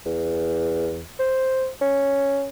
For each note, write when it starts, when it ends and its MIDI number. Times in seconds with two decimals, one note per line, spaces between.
0.06 1.04 40
1.20 1.69 72
1.82 2.49 61